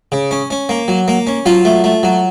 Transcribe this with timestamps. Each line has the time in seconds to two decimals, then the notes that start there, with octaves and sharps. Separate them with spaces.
0.12 C#3
0.31 C#4
0.50 C#4
0.69 A#3
0.88 F#3
1.08 A#3
1.27 C#4
1.46 F#3 F4
1.65 A3
1.84 A3
2.03 F#3